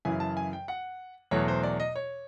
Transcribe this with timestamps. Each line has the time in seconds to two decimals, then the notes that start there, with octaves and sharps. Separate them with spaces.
0.05 F#2 C#3 E3 G#5
0.20 A5
0.37 G#5
0.53 G5
0.68 F#5
1.31 E2 B2 F#3 A3 C#5
1.48 C5
1.63 D5
1.80 D#5
1.96 C#5